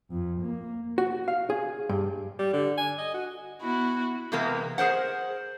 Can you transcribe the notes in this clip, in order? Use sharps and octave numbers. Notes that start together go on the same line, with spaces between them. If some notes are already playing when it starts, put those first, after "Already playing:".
F2
A#3
F#4
F5
G#4
G2
G3
D3
G#5
D#5
F#4
B3 E4 F#4
C3 E3 G#3 A#3 B3
G#4 A#4 C5 F#5